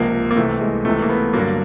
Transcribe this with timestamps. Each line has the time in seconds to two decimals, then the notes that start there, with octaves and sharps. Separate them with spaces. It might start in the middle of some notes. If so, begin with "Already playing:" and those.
Already playing: C#2 C3 F3 A#3
0.31 A#3
0.36 C2 C3 E3 A3
0.61 G#3
0.85 C#2 C3 E3 A3
1.02 A#3
1.09 B3
1.34 G2 D3 F#3 A#3